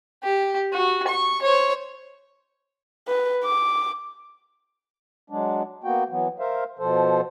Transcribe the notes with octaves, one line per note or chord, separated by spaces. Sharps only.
G4
F#4
C#6
C5 C#5
B4
D6
F#3 G#3 D4
A#3 B3 F#4 G5
E3 F#3 B3
A#4 C5 E5 F5
B2 F3 A4 C5